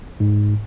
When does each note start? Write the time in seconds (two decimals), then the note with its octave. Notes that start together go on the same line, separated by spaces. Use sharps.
0.20 G#2